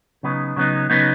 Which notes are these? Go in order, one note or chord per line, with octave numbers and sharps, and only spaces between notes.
C#3 F#3 B3 D#4
C#3 F#3 B3 D#4
C#3 F#3 B3 D#4